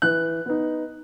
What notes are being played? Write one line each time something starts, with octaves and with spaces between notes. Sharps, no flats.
E3 F#6
B3 D#4